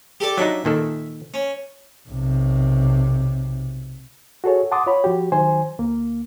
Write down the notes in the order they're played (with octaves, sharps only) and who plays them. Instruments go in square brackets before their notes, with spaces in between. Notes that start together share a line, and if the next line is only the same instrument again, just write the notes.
[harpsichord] G4 A4 D5
[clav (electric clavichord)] F#3 D4 D#4 [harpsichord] E5
[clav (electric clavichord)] A#2 D#3 A4
[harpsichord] C#4
[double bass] B1 C3
[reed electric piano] F#4 G#4 A4 C#5
F#5 A5 C6 D6 D#6
F4 C#5 B5
F3 F#4 G4
D#3 F#3 C5 G#5
D2 A#3